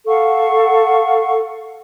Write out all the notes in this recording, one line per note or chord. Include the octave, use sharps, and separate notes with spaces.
A4 F5 F#5 C#6